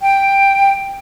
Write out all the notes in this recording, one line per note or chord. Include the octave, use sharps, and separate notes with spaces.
G5